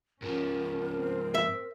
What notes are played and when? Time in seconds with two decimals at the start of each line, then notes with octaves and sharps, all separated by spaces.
0.22 G#2 F3 C#4 A#4
0.93 C4
1.34 E5